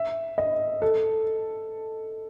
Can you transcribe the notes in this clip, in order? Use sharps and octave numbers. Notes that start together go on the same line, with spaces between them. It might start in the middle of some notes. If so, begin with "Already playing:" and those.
Already playing: E5
D#5
A4